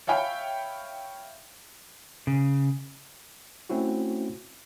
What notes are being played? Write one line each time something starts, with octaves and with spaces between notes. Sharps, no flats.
C#5 E5 F5 G5 B5
C#3
A3 C4 C#4 E4 F#4